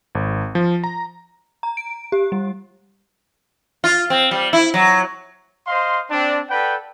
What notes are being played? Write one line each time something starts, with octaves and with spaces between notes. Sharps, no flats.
G#1
F3
A#5
A#5
D7
G4
G3
F4
C4
G3
E4
F#3
C5 D#5 F5 C6
C4 D4
A4 B4 D5 F#5 G5 B5